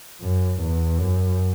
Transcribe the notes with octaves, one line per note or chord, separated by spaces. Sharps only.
F#2
E2
F#2